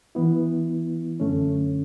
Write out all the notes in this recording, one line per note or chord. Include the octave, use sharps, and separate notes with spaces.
E3 B3 E4
F#2 D3 A3 C#4